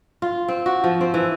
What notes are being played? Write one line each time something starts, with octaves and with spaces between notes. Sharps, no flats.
F4
C4
F#4
F3
C4
E3